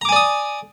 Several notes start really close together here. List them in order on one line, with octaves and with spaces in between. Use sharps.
A#5 D6 G#5 D5 D#6